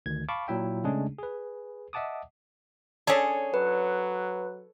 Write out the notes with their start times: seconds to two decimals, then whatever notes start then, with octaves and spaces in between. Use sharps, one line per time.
0.06 D2 D#3 G#6
0.29 F5 A5 B5 C#6 D6
0.48 A#2 F#3 E4 E5 G5
0.84 C#3 G#3 A3 C#4 D4 G#4
1.19 G#4 B4
1.93 D#5 E5 F#5 A5 D6 D#6
3.07 C#4 D4 G#4 A4 C#5
3.54 F#3 B4